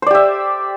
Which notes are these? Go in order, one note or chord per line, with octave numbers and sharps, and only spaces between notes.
G4 C5 D5 E5